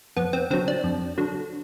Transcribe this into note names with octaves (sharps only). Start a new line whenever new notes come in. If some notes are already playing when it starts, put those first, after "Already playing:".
F2 B3
C4
D3 F#3 C4
D4
F2
D3 F#3